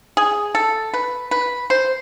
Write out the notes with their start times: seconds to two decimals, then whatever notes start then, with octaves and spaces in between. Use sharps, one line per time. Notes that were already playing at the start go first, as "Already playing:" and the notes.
0.17 G#4
0.55 A4
0.94 B4
1.31 B4
1.70 C5